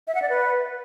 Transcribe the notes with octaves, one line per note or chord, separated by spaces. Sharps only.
E5
F#5
D5
B4